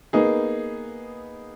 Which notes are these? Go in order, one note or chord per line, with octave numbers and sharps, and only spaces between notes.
A#3 B3 D#4 G#4